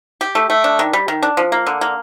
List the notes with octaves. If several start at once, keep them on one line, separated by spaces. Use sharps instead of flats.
G4
A3
A3
D4
D#3
G3
D#3
D4
F3
A#3
D3
A#3